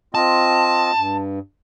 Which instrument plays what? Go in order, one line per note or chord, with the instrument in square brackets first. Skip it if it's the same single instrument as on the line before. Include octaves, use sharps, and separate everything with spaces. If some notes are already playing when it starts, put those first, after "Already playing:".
[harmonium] C4 F4 D#5 [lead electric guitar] A5
[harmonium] G2